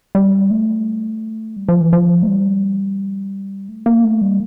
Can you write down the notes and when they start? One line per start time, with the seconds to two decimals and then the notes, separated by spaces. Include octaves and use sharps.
0.15 G3
0.51 A3
1.56 G3
1.69 F3
1.81 E3
1.93 F3
2.23 A3
2.28 G3
3.69 A3
3.86 A#3
4.04 A3
4.21 G3